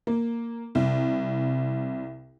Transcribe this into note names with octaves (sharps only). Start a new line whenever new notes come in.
A#3
C2